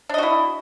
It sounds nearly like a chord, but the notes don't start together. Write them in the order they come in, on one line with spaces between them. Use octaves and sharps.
D4 D#5 F#4 E4